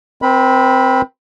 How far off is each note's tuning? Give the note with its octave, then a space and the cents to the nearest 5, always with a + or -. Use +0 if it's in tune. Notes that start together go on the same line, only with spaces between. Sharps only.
C4 +0 A#4 +45 B5 +0